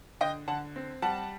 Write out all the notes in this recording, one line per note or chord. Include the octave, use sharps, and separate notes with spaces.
D3 D#5 G5
D3 F#5 A5
C4
G3 F#5 A5